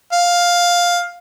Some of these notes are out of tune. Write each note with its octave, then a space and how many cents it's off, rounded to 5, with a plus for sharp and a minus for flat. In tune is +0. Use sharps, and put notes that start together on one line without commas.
F5 +10